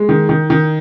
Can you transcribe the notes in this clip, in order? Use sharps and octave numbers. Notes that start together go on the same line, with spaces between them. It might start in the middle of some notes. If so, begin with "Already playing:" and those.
Already playing: G#3
D#3
D#3
D#3